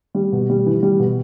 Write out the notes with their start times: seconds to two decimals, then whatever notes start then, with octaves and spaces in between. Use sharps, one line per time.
0.15 G3
0.32 B2
0.50 G3
0.66 E3
0.83 G3
0.99 B2